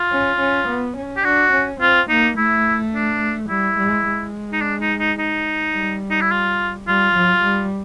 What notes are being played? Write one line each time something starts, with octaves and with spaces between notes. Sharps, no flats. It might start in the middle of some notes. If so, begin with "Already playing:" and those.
Already playing: F4
C#4
C#4
B3
C#4
G4
D4 F#4
C#4
C4 F4
A#3 D#4
A3 E4
D4
G3 E4
G#3
G#3
D#4
D4
D#4
D#4
D#4
G3
D#4
E4
F4
G3 F4
F#3
G3